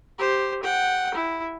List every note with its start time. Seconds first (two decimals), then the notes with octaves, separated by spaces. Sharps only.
0.19 G4 C5
0.63 F#5 G5
1.14 E4